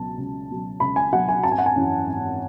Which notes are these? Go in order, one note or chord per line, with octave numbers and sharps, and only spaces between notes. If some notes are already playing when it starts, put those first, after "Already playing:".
Already playing: C#2 B2 F#3 A5
C#2
B2 F#3
C#2 B5
G#5
B2 F#3 F#5
G#5
G#1 A5
G#5
F#5
G#5
F#2 E3
G#1